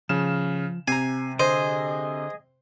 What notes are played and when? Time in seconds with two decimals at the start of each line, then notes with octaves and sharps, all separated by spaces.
0.09 C#3 F3 F6 E7
0.88 C3 C4 G#5 A#5 C7
1.40 D3 G#4 C5 D#5